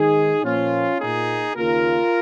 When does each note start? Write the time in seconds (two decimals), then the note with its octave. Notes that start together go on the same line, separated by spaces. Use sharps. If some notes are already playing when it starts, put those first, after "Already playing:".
Already playing: G#2 D#3 G#3 D#4 G#4
0.43 A#2 F3 A#3 C#4 F4
0.99 A#2 A#3 D#4 G#4
1.55 D#2 C#3 A#3 F4 A#4